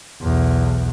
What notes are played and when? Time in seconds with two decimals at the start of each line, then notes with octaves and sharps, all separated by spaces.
0.21 B1 E2